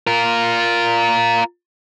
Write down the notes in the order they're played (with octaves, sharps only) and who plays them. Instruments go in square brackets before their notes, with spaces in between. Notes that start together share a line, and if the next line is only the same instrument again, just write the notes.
[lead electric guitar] F4 A#4